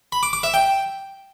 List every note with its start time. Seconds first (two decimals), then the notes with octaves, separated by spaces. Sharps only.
0.12 B5
0.23 D6
0.33 D6
0.43 E5
0.54 G5